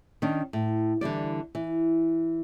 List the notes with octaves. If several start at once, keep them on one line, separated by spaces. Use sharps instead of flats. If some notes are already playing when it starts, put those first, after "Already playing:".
D#3 C#4 D4
A2
D3 E3 G3 D5
E3